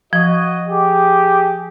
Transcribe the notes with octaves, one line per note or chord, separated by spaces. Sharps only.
F3 F#4 D#5
G4 G#4